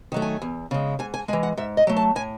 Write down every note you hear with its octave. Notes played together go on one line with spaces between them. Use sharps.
D#3 F#3 A3
G#5
E2
C#3 G#3
G#2 G#5
G#5
E3 G#3 G#5
F#5
G#2 E5
D#5
F#3 A3
A5
A2 G#5